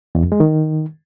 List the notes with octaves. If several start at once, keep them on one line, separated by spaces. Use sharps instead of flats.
E2
F2
G#3
D#3